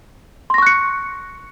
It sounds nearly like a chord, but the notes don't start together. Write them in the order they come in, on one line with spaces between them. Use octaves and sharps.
C6 A#6 C#6 F#6 C#7